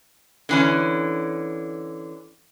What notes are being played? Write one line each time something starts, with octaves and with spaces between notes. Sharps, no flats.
D3 E3 C#4